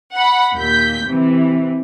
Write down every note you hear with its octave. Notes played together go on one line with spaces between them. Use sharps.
F#5 B5
D#2 A#2 G6 B6
C3 E3